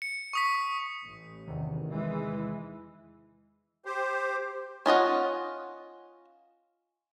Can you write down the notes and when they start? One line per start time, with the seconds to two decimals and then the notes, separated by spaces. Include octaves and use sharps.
0.02 C#7
0.33 C#6 D#6 B6
1.03 A1
1.48 E2 C3 D#3
1.88 E3 G#3
3.85 G4 C5
4.86 C#4 F4 D#5 F#5